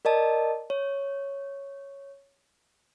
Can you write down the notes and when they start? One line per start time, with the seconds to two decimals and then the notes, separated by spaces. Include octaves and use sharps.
0.05 A#4 D5 D#5 A5
0.70 C#5